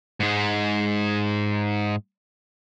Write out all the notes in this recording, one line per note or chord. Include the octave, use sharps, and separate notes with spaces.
G#2 G#3